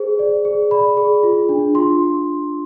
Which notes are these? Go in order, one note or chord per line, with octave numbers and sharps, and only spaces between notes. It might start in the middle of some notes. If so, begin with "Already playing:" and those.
Already playing: G#4 C5
D5
G#4
D5 B5
G#4
F4
D4
F4 C6